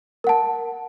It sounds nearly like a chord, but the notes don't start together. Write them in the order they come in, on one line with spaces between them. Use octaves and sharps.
A#4 F#5 A5